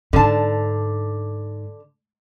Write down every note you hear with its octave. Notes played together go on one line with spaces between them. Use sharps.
G#2 D3 A5